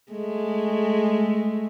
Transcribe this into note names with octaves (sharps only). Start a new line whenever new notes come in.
G#3 A3